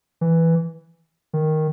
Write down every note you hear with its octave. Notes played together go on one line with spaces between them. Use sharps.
E3
D#3